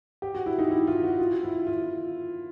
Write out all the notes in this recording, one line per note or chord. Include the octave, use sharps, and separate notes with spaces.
G4
F#4
E4
D#4
E4
F4
F#4
F4
E4
F4